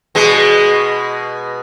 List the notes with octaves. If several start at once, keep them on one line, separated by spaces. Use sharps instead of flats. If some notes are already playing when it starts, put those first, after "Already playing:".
B2 G#3